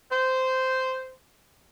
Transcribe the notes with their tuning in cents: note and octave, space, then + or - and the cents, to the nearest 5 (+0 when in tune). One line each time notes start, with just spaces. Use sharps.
C5 -10